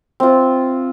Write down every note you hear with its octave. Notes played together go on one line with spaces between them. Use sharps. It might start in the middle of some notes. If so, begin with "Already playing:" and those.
C4 F4